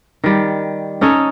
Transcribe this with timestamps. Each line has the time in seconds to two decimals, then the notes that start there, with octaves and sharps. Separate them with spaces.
0.24 D#3 G3
1.01 C#4 D#4 A4 C#5